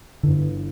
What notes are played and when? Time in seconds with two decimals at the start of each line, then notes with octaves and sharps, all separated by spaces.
0.23 G1 G2 D3 E3